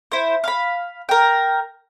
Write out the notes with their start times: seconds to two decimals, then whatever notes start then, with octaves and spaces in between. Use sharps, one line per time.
0.12 E4 C5
0.44 F5 B5
1.09 A#4 G5